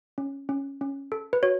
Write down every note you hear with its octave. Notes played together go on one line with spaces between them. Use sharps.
C#4
C#4
C#4
A4
B4
F#4 C#5